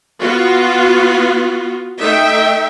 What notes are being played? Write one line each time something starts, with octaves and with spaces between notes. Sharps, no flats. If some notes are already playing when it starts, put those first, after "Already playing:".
B3 F4 F#4
A3 D#4 E5 G5